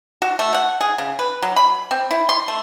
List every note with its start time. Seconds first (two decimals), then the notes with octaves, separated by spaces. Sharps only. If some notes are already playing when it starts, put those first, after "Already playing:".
0.22 F#4
0.39 A3
0.54 F#5
0.81 G#4
0.98 C#3
1.19 B4
1.42 F#3
1.56 B5
1.91 C4
2.11 E4
2.29 C6
2.48 A3